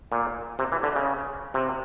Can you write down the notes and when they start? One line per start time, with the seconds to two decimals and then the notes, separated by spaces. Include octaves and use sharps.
0.12 A#2
0.59 C3
0.72 E3
0.83 D3
0.96 C#3
1.54 C3